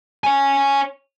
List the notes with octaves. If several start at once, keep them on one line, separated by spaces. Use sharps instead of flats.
C#5 G#5